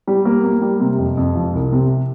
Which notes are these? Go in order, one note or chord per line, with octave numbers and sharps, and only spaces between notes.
G3
A#3
A#3
G3
C3
F2
F2
F3
C2
C3